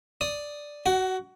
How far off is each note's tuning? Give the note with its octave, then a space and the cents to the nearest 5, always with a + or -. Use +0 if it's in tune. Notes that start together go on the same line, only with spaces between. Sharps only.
D5 +0 D#6 +0
F#4 +15 F#5 +40